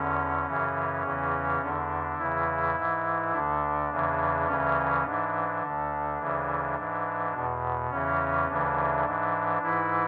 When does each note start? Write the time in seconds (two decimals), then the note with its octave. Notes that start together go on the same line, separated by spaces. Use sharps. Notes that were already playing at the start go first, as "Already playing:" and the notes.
Already playing: E2 D3 C#4
0.46 F#2 C#3 E3
1.03 E2 C#3 E3
1.61 E2 D3 D4
2.18 E2 C#3 E3 E4
2.75 G#2 E3
3.32 D2 D3 D4
3.90 E2 C#3 E3
4.47 D2 C#3 E3 C#4
5.04 G#2 E3 D4
5.61 D2 D3
6.18 D2 C#3 E3
6.77 G#2 E3
7.33 E2 B2
7.90 E2 C#3 E3 C#4
8.48 D2 C#3 E3 D4
9.05 G#2 E3
9.62 G#2 E3 E4